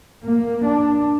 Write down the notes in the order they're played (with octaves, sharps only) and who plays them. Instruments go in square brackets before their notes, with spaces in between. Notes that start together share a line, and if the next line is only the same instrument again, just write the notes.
[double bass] A#3
D4